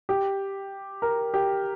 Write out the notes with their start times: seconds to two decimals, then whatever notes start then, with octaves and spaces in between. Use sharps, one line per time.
0.09 G4
1.02 A#4
1.34 G4